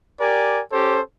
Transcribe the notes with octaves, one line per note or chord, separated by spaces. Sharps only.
G4 A#4 D5 G#5
C#4 G4 A4 C5